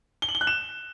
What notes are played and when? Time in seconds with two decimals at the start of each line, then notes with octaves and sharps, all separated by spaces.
0.22 G7
0.29 F#7
0.35 G7
0.41 F#6
0.47 E7